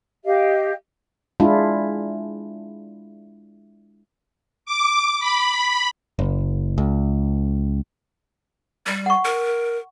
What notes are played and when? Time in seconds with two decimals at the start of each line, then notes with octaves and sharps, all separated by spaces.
0.25 G4 D#5 F5
1.40 G#3 D4 E4 F4
4.66 D6
5.20 B5
6.19 F#1
6.78 C#2
8.87 G3
9.06 F#5 C#6
9.25 A#4